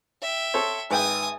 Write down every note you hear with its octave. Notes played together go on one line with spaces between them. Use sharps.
E5 G5
A4 C5 C#5
G#1 B4 G5 G#5 D#6